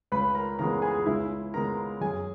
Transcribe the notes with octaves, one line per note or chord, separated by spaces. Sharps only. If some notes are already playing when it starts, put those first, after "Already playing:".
C#2 B4 B5
A#4 A#5
C#3 E3 G#3 B3 A#4 A#5
G#4 G#5
C#2 E4 E5
C#3 G#3 B3 A#4 A#5
F#2 G#4 G#5